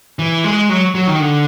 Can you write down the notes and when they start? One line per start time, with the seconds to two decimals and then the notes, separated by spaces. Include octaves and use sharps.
0.19 E3
0.44 G#3
0.69 F#3
0.95 F#3
1.07 D#3
1.20 D3